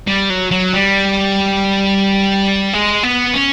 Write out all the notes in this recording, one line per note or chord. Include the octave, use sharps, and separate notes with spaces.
G3
F#3
F#3
G3
G#3
B3
C#4